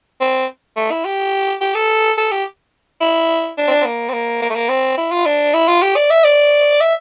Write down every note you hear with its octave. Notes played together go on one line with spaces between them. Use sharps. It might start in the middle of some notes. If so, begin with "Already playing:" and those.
C4
A3
E4
G4
G4
A4
A4
G4
E4
D4
C4
D4
C4
A#3
C4
A#3
A#3
A3
A#3
C4
E4
F4
D4
E4
F4
G4
D5
E5
D5
E5